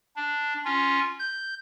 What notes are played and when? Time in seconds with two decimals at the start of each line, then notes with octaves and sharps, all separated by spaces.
0.16 D4
0.65 C#4 F4
1.20 G6